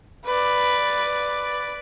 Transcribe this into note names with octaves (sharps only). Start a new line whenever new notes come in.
B4 D5